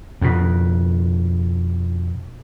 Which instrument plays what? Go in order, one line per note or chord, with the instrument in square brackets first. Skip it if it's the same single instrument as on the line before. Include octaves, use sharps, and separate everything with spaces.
[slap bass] F2 B2